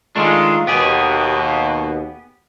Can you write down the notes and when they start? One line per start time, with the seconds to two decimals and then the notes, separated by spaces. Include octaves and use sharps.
0.16 D#3 G#3 A3 D4 F4
0.67 D#2 B2 B3 G4 G#4